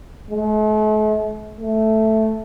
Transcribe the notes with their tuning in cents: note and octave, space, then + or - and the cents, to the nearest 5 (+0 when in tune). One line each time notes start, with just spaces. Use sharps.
A3 -45
A3 +0